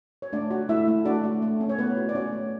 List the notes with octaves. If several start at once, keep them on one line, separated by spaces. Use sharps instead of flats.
C#5
A3 D4 D5
F#4
A3 E4 E5
A3
D4 F#4 D5
A3
A3
C#4
C#5
A3 B3 B4
F#4
D5
C#4 F#4 C#5
A3